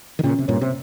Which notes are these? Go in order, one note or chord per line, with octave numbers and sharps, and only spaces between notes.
D#3
A#2 C#3 C#4
C3
G2 A#2 C#5
C3